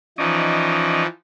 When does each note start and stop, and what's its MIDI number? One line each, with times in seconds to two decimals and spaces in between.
0.18 1.06 52
0.18 1.06 53
0.18 1.04 61
0.18 1.06 63
0.18 1.04 74
0.18 1.04 75